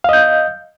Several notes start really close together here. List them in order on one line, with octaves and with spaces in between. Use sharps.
F5 D#5 G6